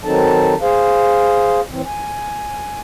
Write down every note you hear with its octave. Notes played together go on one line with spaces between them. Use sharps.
D#3 F#3 C4 D#4 A4 A5
G#4 C5 F5
A2 E3 C4
G#5